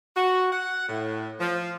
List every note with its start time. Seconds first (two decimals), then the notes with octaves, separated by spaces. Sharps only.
0.17 F#4
0.53 F#5
0.89 A2
1.40 F3